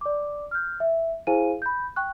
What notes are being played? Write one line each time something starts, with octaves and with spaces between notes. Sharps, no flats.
D5 D6
F6 G6
E5
E4 G#4 C5 F5 G#5 D#7
B5 G6
G5 C#6 F#6